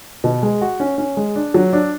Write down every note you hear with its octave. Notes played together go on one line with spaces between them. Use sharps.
B2
G#3
F#4
C#4
C#4
G#3
D4
F#3
D4